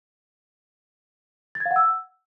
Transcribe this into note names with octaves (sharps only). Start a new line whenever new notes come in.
A6
G#6
F5
F#5
E6